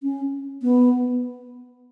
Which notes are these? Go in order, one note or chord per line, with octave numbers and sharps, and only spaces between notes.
C#4
B3